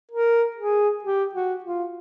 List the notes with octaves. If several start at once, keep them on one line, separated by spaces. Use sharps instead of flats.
A#4
G#4
G4
F#4
F4